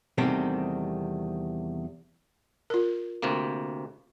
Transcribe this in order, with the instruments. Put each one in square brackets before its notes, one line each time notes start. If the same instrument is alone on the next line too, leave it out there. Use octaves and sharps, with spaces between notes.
[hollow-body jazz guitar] E2 C3 D#3 G3 A3 C4
[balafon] F4 A#4
[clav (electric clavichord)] D2 C3 A#3